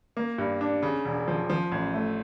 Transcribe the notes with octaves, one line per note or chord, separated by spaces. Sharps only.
A#3
G2
D4
C#3
E1
F3
F3
A1
A3